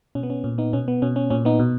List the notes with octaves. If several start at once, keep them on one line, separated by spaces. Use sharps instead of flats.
B2 C#4
B3
C#4
A#2 C#4
B3 D#4
B2 C#4
B3
B2 C#4
C#4
A#2 C#4
B3 D#4
B2